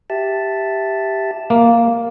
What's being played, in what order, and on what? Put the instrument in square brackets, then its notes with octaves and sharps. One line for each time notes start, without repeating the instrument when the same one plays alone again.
[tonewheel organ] G4 E5 A5
[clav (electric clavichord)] A#3